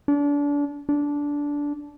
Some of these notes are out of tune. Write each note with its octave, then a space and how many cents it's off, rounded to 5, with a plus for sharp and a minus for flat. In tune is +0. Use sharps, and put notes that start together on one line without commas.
D4 -30
D4 -15